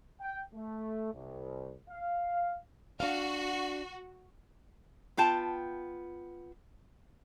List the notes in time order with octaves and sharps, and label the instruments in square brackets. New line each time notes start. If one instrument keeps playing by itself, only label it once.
[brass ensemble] G5
A3
C2
F5
[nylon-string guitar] D4 F5 [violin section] F#4
[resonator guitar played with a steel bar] B3 F4 G5 A5